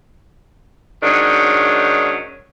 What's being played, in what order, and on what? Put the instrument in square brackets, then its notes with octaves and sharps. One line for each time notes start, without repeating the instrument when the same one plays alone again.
[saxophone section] G#2 D#3 F#3 C#4 D4